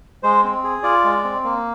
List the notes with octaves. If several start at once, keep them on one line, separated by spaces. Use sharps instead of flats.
G#3 C5
C4
G#4
F4 D5
G#3
C4
A#3